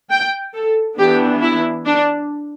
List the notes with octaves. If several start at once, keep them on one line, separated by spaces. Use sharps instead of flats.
G5
A4
E3 B3 D4 G4
E4
D4